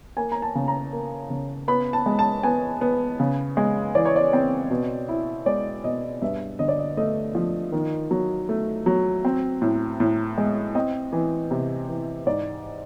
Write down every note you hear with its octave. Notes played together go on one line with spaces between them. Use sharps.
A#3 G#5
A#5
A5
C#3
A#5
A#3
C#3
B3 B5
A5
G#3
A5
B3 G#5
B3
C#3
G#3
E3 D5
C#5
D5
C4
B2
E4
G#3 D5
B2 D#5
G2 E5
D3 D#5
D5
D#5
A3 D#5
F3
D#3
F#3
A3
F#3
C4
A2
A2
G#3
C4 D#5
E3
C3
E3
G#2 D5